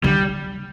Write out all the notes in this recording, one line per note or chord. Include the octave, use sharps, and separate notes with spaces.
D3 G3